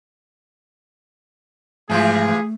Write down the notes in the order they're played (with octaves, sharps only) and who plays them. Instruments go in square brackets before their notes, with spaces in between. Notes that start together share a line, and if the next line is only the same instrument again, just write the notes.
[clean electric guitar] G#2 F3 [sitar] C3 E3 F4 [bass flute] A3 [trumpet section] G#4